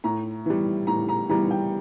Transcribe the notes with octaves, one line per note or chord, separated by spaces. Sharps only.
A2 A#5
E3 G3
A2 A#5
A#5
E3 G3 A#5
G5